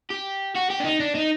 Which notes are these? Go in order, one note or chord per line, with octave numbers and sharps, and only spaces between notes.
G4
F#4
G4
D4
D#4
D4
D#4